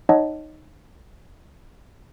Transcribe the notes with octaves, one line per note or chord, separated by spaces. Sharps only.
D#4 C#5 D#5 F#5 A5